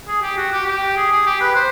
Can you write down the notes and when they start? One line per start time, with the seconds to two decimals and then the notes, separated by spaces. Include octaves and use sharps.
0.07 G#4
0.22 G4
0.37 F#4
0.52 G4
0.66 G4
0.96 G#4
1.11 G#4
1.26 G4
1.40 B4
1.55 C5